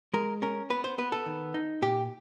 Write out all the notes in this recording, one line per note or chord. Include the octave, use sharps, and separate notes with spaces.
G#3 A#4
C#4 A#4
B3 B4
C5
B3 B4
A4
D#3
D#4
A#2 G4